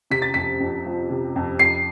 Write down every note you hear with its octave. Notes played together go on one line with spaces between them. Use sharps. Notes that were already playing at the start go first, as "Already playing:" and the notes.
C3 B6
A6
F2 B6
F2
F3
C3
F2
F2 C7